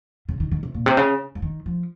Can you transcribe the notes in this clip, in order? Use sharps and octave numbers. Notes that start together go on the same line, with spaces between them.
C#3
D#3
D#3
C3
A#2
C3
C#3
F3
D#3
F3